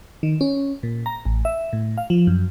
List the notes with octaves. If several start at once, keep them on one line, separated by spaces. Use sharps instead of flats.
D#3
C#4
A#2
A#5
A1
E5
A2
F5
F3
F#2